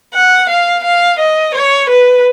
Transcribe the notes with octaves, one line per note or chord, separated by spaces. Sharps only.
F#5
F5
F5
D#5
C#5
B4